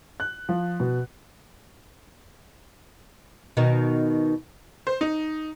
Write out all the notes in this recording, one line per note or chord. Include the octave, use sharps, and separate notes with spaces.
F#6
F3
B2
B2 D#3 D#4
C5
D#4